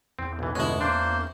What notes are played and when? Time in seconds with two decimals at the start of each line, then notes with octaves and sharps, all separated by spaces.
0.19 E2 C4
0.39 B1 E3
0.55 G1 B2 G#3 C#4 E4
0.81 A#3 D4 C5 C6